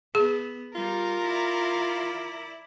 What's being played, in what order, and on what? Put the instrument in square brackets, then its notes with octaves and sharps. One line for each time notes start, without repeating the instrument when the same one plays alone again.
[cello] B3 [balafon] G#4
[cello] G3 [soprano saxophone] F4 [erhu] A#4
[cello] E4 D5